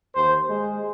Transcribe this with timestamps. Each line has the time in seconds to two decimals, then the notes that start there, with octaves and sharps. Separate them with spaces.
0.16 D#2 C5
0.50 G#3